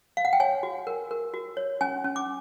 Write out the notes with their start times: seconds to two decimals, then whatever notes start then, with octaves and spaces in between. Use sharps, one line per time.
0.17 F5
0.25 F#5
0.33 G5
0.40 C#5 G#5
0.63 F#4
0.87 A#4
1.11 A#4
1.34 F#4
1.57 C#5
1.81 C#4 G#5
2.04 C#4
2.16 D6